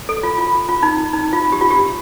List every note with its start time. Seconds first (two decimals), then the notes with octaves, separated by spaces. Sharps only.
0.09 A4
0.23 F4
0.38 F4
0.69 F4
0.83 D#4
1.13 D#4
1.33 F4
1.52 G4
1.61 F4
1.70 G4